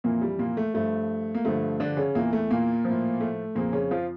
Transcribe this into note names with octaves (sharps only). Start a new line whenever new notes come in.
F2 A#2 E3 A#3
G3
A#2 A#3
A3
G2 F3 A3
A#3
G2 D3 F3 A3
D3 D4
C#3 C#4
E2 A#2 E3 A#3
A3
A#2 A#3
F3
A2
A3
F2 A#2 C#3 F3 A#3
C#3 C#4
F3 F4